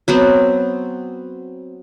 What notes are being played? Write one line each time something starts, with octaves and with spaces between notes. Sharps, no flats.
F#3 B3 C4